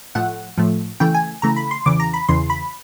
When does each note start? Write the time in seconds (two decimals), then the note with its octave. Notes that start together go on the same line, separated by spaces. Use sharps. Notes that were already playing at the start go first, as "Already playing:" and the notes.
0.15 A2 F3 A3 F#5
0.58 A2 F3 A3
1.00 C#3 E3 A3 G5
1.14 G#5
1.42 C#3 E3 A3 A#5
1.56 B5
1.71 C6
1.86 E2 C#3 E3 D6
2.00 A#5
2.14 B5
2.28 E2 C#3 E3 C6
2.50 B5